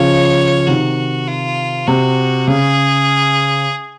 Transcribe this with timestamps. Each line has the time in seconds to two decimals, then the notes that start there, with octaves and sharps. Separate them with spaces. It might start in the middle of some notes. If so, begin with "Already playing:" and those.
Already playing: C#3 F3 C#5
0.67 C3 D#3 F#4
1.27 F4
1.87 C3 F#4
2.47 C#3 G#4